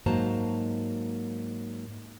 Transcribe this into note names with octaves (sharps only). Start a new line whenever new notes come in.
G#2 F#3 A#3 C5 A5 A#5